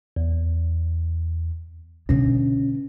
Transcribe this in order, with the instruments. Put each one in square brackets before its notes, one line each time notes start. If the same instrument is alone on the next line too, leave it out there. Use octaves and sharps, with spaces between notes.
[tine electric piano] E2
[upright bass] B2 D3 [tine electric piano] C#4